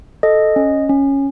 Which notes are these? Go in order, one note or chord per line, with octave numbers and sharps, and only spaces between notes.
A4 D#5
C#4
C#4